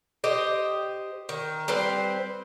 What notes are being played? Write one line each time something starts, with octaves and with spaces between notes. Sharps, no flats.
G4 C5 D#5
D#3
G3 C4 B4 C5